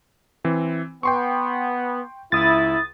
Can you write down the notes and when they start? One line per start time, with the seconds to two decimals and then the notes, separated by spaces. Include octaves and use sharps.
0.44 E3 C4
1.03 B3 G5 C6 C#6
2.32 C#2 E4 D#6 A6